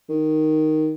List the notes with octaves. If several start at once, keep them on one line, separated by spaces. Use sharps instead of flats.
D#3